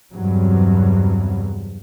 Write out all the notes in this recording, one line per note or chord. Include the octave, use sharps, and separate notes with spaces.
E2 G2 C3 F#3